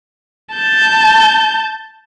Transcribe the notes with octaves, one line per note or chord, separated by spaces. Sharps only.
A5 G6